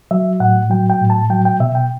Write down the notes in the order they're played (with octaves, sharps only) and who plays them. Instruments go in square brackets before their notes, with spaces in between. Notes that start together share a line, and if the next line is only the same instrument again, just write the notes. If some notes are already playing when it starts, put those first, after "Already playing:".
[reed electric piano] F#3 E5
A2 F#5
F#3 G5
G5
A2
A5
F#3 G5
G5
B2 E5
G5